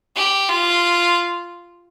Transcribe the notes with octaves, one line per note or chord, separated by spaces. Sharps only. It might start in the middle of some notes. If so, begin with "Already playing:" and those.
G4
F4